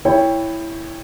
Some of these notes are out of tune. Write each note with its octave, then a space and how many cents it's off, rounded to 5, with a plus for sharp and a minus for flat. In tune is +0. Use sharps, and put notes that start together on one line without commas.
E4 +0 C#5 +0 G5 +15